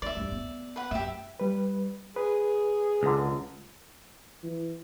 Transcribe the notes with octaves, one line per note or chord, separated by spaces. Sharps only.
D#4 D5 E5
D2 G2
B3
B4 F#5
F#2 G4 E5
G3 B4
G#4 B4
C#2 D3 A#5
E3